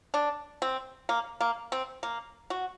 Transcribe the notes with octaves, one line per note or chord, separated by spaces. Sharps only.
D4
C4
A#3
A#3
C4
A#3
F#4